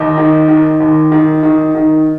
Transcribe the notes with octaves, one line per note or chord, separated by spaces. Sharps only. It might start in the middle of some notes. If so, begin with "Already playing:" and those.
Already playing: D#2 D#4
D#3
D#3
D#2
D#3
D#3
D#3